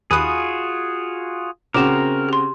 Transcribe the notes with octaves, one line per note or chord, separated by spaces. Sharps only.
D#2 F4 F#4 G#4 G#5 B5 D#6 F#6
A#1 C#3 C4 F#4 A#4 D6 E7 F7
G4 C6